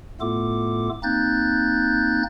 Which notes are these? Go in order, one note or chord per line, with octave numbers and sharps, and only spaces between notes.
A2 A3 B3 F4 A4 D6
A#3 C4 D#4 F#6 G6 A6